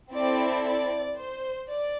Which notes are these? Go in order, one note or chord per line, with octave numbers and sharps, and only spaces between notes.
C4 E4 A4 D5
D5
C5
D5